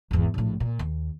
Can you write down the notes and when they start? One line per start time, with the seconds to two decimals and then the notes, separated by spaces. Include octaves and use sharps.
0.11 G#1 E2
0.34 A#1 A2
0.60 A#2
0.79 D#2